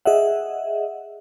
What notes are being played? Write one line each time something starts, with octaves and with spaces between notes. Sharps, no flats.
G#4 D#5 E5 F#5